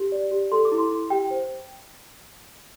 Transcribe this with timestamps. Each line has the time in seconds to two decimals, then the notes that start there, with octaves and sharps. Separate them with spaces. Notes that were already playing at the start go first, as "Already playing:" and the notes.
Already playing: G4
0.12 D5
0.31 G4
0.51 A4 C6
0.65 D6
0.72 E4
0.78 C6
0.91 E4
1.10 G4 G5
1.31 C5